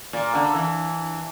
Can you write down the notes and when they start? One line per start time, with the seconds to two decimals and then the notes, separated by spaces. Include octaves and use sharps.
0.13 A#2
0.35 D3
0.55 E3